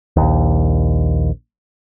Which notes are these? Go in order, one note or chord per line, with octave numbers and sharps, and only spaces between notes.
A#1 D#2